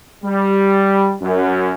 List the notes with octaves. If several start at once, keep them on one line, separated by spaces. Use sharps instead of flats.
G3
F#2